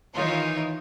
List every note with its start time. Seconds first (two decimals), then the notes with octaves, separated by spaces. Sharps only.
0.15 D#3 E3 D#4 F4 C#5